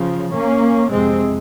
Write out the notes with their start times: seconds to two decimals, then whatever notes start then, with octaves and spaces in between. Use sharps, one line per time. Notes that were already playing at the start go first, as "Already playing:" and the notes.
Already playing: C#3 F3
0.34 A#3 C#4
0.91 F2 C3 G#3 C4